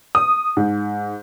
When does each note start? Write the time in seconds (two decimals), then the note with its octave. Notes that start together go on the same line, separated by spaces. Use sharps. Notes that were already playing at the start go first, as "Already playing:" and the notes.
0.15 D#6
0.57 G#2